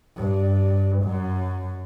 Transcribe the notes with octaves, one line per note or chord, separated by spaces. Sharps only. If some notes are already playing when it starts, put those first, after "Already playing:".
G2
F#2